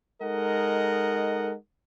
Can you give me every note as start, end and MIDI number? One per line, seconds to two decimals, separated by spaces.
0.21 1.53 56
0.21 1.53 63
0.21 1.53 69
0.21 1.53 70
0.21 1.53 75
0.21 1.53 78